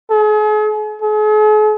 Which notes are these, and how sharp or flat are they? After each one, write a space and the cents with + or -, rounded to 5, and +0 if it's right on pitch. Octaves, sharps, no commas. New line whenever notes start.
G#4 +40
G#4 +45